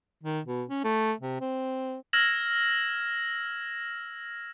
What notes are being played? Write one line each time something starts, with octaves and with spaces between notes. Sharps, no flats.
D#3
B2
C#4
A3
C3
C4
E6 F6 G#6 A#6 E7 F#7